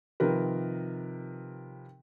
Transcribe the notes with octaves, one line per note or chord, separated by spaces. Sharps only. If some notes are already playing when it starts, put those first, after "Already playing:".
C3 D#3 F3 A#4 B4